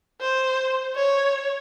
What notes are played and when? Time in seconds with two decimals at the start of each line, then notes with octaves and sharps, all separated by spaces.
0.21 C5
0.95 C#5